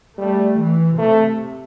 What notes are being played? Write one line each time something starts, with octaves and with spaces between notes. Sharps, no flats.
G3 A3
E3
C3 A3